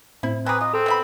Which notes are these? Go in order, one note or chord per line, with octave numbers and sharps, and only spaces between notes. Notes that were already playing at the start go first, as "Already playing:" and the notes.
A2 C4 E4
C4 G#4 B4 G#5 A#5 D6
F4 D#5
C4 A4
B3 E5 B5